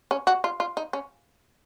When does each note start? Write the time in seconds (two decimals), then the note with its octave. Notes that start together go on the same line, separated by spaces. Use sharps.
0.11 C#4
0.27 F#4
0.44 F4
0.60 F4
0.77 D#4
0.93 C#4